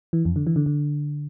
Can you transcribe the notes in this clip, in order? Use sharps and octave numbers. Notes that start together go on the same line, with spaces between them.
E3
F2
D3
E3
D3
D3